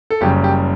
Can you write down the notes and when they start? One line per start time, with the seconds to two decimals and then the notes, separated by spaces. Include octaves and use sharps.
0.10 A4
0.21 F#1 F#2 C#3 G3 G4
0.44 G4